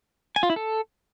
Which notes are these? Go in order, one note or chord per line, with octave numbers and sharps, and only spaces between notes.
G#5
F4
E4
A4